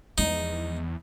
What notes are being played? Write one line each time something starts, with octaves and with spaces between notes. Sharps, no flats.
E2 F3 G#3 D#4